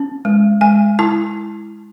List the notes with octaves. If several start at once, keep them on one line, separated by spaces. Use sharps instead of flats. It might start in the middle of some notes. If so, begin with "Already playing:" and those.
Already playing: C#4
G#3
G#3 G#5
E4 A5